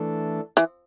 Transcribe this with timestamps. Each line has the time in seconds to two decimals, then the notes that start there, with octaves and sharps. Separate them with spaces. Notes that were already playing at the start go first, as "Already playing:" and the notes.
Already playing: E3 A3 D4 A4
0.57 E3